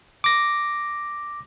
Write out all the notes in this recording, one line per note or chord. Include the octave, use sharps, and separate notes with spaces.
D6 A#6